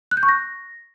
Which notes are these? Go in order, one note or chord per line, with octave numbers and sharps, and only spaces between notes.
F#6
G6
C#6
A#6